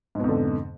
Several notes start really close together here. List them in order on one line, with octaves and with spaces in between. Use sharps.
G#2 B2 F2 D3